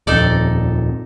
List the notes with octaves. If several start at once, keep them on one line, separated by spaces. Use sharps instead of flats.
D#1 F2 D#4 A4 D5